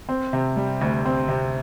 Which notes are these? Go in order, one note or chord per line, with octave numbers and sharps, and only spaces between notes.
C4
C3
G3
D2
C4
C3